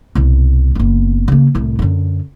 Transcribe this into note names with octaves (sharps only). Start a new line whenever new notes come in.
C2 B2
F#1 B3
C#3 A#3
C2 A2
F#2 D3